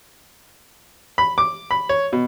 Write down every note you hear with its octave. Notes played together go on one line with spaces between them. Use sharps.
B5
D6
B5
C#5
B2